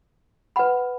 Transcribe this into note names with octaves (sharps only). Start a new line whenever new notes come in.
B4 F#5 B5